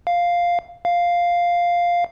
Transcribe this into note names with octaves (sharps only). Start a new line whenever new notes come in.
F5
F5